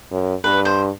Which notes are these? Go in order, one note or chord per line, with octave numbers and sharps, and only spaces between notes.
F#2
G2 B4
C5